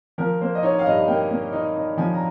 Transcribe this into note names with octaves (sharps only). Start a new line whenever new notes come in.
F3 A#4
A#3 C5
D#5
D#4 C#5
F5
G2 D#5
A#3 G5
A#3
D#4
D#4
F3 G#5
A#5